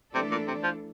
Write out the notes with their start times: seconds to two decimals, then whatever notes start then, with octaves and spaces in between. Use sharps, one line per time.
0.14 C3 E3 A3 D4 A4 D5
0.31 A#2
0.47 C3
0.64 F3